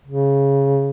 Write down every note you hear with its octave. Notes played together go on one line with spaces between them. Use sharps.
C#3